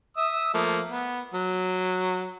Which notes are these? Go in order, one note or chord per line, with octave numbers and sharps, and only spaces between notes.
E5 D#6 E6
F3 A3 A#3
B3
F#3